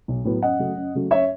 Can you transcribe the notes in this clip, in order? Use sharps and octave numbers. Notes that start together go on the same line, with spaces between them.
B1
A2 F#3 B3
F#2 D#5 F#5
C#3 F#3 A3
F#2
C#3 F#3 A3
F#2 C#5 E5